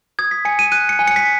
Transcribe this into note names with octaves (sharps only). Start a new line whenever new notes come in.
D#6 G#6
B6
G#5 C#7
D#7
F#6 D#7
C#7
G#5
C#7
B6